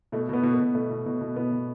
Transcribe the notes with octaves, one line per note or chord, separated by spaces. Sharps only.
B2 A3
B2 B3
B2
B3
B2
B2 A3
B2
B2
B2
B2 B3
B2